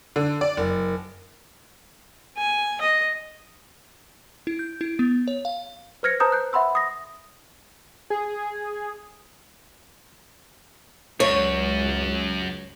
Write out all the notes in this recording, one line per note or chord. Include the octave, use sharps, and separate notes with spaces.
D3
D5
F#1
G#5
D#5
E4
G6
E4
B3
C#5
F5
B4 C5 F6 G#6 A#6 C#7
B4 C5 A5 A#5 D#6 G6
F#6 G6
E5 F#5 B5 C6 E6
D#6 A#6
G#4
C#2 F#2 C#5